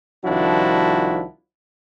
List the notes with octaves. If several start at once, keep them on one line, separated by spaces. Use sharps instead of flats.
C2 D#3 F3 D4 E4 F#4